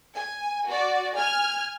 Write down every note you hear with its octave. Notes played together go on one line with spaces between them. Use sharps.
G#5
F#4 D5
G#5 F6 G#6